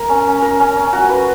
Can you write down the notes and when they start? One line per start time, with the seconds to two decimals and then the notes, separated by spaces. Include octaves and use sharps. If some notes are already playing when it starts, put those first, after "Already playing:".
Already playing: A#4
0.09 C#4
0.27 C#4
0.42 A#4
0.60 C#4
0.76 C#4
0.93 F#4
1.09 B4